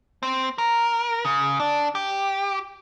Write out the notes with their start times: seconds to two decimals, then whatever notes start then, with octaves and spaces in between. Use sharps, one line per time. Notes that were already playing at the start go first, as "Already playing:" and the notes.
0.23 C4
0.58 A#4
1.25 C#3
1.60 D4
1.95 G4